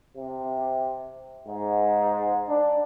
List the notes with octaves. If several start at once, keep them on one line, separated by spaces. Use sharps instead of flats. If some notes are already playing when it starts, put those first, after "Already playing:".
C3
G#2
D4